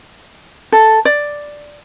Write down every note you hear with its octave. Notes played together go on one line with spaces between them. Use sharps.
A4
D5